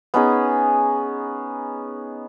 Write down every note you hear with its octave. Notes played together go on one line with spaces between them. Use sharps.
B3 C#4 D#4 G#4